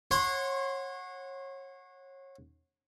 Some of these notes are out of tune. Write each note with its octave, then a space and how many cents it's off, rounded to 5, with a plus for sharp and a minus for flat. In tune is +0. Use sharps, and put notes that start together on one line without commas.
C#5 -30 F#5 -10 C6 +0